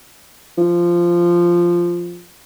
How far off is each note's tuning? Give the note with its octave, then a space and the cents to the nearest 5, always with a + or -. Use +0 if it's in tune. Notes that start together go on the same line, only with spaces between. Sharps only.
F3 -10